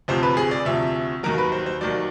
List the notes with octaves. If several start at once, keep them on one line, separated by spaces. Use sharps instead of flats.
D2 C3 F3 C5
B4
G#4
D5
D2 C3 F3 E5
D#2 D#3 F#3 A#4
B4
C5
C5
D#2 D#3 F#3 D5